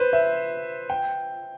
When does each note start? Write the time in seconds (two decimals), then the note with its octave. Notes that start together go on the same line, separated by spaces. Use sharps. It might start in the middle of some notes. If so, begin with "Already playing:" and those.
Already playing: B4 C5
0.13 E5
0.90 G5